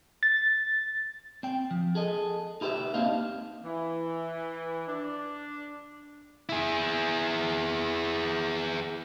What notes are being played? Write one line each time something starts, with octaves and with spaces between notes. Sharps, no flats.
A6
C4 G5
F3
G#4 A4 D#5
D#4 E4 G4 B4 E5
A#3 C4 D4 D#4 F5
E3
D4
E4 G#4